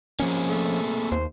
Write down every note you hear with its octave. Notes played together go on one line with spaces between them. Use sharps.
F3 A#3 C4 C#4 G#4
A3
D#2 C5